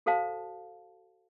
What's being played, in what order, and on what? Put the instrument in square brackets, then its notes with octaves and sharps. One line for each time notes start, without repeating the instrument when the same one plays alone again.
[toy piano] F#4 A4 C5 F5 A5